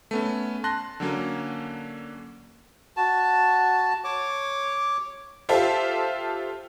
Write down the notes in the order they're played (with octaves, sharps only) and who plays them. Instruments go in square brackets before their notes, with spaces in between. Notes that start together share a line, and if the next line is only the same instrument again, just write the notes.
[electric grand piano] A3 B3 C#4
A5 C6 F#6 A#6
D3 F#3 A#3 C#4
[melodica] F#4 A5
C#5 D6
[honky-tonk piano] F4 G4 A4 C5 E5 F5